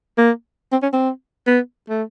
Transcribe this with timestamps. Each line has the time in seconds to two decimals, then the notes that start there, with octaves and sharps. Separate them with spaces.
0.18 A#3
0.72 C4
0.82 C#4
0.93 C4
1.46 B3
1.89 A3